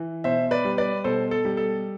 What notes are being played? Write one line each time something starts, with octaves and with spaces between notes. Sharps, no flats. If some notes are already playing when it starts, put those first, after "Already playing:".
Already playing: E3
B2 C5 E5
B4 D5
G3
B4 D5
B2 A4 C5
A4
G3
A4